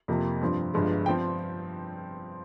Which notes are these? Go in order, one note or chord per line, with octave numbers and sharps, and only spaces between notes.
F2 C3 F3 A#3
G2 F3 C4
G1 G2 F3 G#3
F3 C4 G5